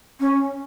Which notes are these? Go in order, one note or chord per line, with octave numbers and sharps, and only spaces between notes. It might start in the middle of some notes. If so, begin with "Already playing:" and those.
C#4